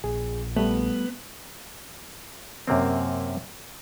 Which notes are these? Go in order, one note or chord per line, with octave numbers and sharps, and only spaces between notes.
A#1 G#4
G3 A3 B3
F#2 C3 A#3 C4